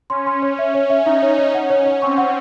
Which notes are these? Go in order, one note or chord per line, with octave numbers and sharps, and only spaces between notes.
C#4 C6
C6
C#5
C#4 E5
C#5
E5
D#4 E5
C#5
C#5
C#4 F#5
C#5
C#5
C4 C#6
F#5